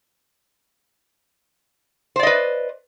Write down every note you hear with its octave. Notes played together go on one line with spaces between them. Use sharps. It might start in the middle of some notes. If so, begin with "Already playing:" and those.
B4 C5 D5 D#5